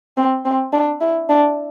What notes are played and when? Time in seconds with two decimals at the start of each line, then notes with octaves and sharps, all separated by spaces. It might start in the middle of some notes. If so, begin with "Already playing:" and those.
0.17 C4
0.45 C4
0.73 D4
1.01 E4
1.29 D4